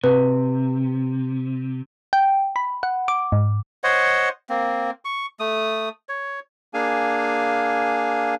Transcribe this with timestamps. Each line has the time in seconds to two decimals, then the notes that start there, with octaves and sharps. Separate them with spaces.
0.04 C3 B4
2.13 G5
2.56 B5
2.83 F#5
3.08 D6
3.32 G#2
3.84 C5 C#5 D#5 F#5
4.49 A#3 C4
5.05 C#6
5.40 A3 D#6
6.09 C#5
6.74 A#3 D4 G#4 F5 G#5